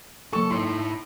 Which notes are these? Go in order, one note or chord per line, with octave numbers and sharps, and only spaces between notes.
F#1 A4 C#6
D#4 E4 C#5 C6